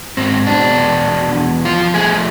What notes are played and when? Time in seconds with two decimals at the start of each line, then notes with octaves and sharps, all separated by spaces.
0.17 G#2 C4
0.47 B2 D4
0.76 E2
1.06 B2
1.35 E2
1.65 F3 F4
1.94 A3 G#4